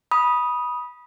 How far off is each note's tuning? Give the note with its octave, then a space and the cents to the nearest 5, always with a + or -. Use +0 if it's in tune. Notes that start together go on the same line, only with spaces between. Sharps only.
B5 -20 D#6 +0